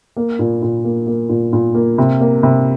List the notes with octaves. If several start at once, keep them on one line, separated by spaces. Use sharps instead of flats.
A#3
A#2
A#2
A#3
A#3
A#2
A#2
A#3
C3
A#3
C3